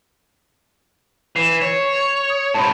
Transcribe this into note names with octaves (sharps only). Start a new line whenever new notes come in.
E3 C7 E7
C#5
D#6
G#2 C3 A5 B5